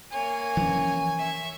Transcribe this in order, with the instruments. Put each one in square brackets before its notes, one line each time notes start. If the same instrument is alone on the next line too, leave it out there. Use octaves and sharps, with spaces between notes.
[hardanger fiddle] A#3 C#5 [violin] G#5
[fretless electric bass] E3 F3 C#4
[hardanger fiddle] E5 C#6